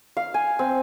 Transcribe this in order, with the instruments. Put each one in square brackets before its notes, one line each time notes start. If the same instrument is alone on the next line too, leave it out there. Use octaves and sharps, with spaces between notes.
[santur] F5
G#5
C4